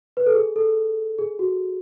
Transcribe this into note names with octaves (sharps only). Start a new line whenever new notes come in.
B4
A4
G#4
A4
G#4
F#4